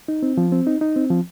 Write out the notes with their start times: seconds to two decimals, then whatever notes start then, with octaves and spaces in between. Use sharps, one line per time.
0.08 D#4
0.23 C4
0.38 F3
0.52 C4
0.67 D#4
0.81 D#4
0.96 C4
1.10 F3